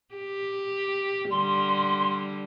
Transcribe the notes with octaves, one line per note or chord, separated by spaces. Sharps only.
G4
D3 G3 C6